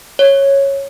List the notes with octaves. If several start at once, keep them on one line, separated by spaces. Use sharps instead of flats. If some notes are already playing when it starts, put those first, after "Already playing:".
C#5